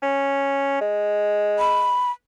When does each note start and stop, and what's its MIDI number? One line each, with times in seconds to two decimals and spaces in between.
0.03 0.80 61
0.81 1.97 56
1.59 2.11 83